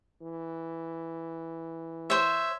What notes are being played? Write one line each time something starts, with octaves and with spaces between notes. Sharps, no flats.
E3
C5 C#5 E5